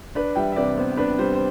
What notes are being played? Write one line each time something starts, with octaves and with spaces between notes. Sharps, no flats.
D4 B4 D5
G3 E5 G5
E5
C3 B4 D5
B3 C5
D4 B4
G3 C5
C5